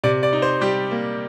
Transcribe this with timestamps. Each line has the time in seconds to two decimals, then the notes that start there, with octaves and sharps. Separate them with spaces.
0.04 C3 D5
0.23 D5
0.33 D#4
0.42 C5
0.61 G3 G4
0.91 A#3